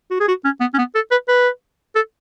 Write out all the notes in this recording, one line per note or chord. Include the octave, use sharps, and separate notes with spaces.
F#4
G#4
F#4
C#4
B3
C#4
B3
A4
B4
B4
A4